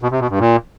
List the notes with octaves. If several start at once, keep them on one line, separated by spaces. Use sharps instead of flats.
B2
C3
B2
G2
A#2